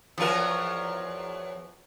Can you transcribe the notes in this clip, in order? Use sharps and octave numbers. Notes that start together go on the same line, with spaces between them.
E2 F3 F#3 F4 A#4